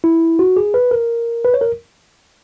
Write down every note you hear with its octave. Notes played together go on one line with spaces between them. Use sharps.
E4
F#4
G#4
B4
A#4
B4
C#5
A#4